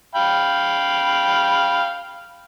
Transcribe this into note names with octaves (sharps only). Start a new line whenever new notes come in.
F5 G5 B5